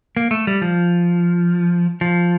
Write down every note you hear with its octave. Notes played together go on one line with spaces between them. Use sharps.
A#3
A3
G3
F3
F3